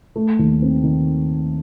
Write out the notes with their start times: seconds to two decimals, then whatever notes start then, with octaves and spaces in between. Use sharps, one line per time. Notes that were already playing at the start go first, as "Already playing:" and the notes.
0.16 A3
0.39 D#2
0.62 C4
0.84 D#3